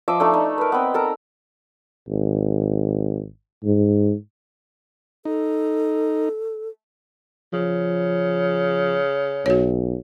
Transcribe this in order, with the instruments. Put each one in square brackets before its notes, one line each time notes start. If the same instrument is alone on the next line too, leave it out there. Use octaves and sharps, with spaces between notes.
[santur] F3 D#5 E5 D6
A3 D4 D#4 A4
D#4
A#4 B4
B3 C4
A4 A#4 A#5
[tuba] G#1
G#2
[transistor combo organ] D#4 [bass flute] A4
[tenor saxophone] C#3 [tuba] F3
[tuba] B1 [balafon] F#4 C#5